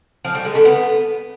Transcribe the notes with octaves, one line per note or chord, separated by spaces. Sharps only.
F3
G3
G#3
D3
B3